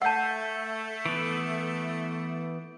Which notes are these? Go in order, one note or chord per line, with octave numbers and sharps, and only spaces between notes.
A3 F#5 A5 E6 G6
E3 B3 D7